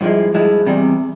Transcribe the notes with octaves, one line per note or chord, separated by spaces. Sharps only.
G2 F3 G#3 E4
G2 F3 G#3 E4
E2 C3 G3